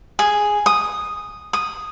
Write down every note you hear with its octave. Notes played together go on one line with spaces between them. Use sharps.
G#4
D#6
D#6